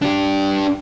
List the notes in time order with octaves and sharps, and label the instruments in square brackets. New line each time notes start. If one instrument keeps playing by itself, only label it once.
[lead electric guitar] D4 G4